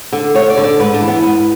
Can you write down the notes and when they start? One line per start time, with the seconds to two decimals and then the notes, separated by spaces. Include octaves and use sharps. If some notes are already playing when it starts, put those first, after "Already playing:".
0.12 D3
0.34 D2 C#5
0.50 D5
0.57 D3
0.64 D5
0.79 G#2 B4
0.94 D4
1.01 E3
1.08 B3
1.22 G#2 B3